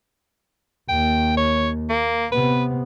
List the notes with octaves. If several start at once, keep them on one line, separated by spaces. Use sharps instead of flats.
D#2 G5
C#5
A#3
C3 B3 B4